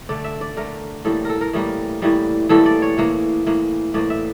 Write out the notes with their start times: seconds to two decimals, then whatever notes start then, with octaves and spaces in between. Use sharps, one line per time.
0.09 D3 A3 D5
0.24 E5
0.41 D5
0.57 D3 A3 A#4
1.05 A2 E3 G3 A#3 A4
1.25 A4 A#4
1.41 A#4
1.53 A2 E3 G3 A#3
2.02 A2 E3 G3 A#3
2.49 A2 E3 G3 A#3 A4
2.66 D5
2.82 C#5
2.98 A2 E3 A#3
3.47 A2 E3 A#3
3.94 A2 E3 A#3 D5
4.10 E5